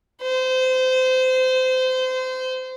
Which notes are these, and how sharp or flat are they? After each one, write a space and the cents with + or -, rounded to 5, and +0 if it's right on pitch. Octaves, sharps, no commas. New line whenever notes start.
C5 -25